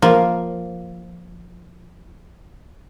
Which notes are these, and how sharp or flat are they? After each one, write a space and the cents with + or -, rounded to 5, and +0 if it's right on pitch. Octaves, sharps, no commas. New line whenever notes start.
F3 +0 A#3 +0 F4 +0